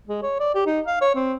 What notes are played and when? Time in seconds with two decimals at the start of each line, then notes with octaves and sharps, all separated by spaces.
0.07 G#3
0.23 C#5
0.40 D5
0.55 G4
0.66 D#4
0.87 F5
1.01 C#5
1.15 C4